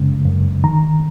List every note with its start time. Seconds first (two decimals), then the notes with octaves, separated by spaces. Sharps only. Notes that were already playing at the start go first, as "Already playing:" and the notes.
Already playing: F#2 C#3 G#3
0.25 F#2
0.64 D#3 A#5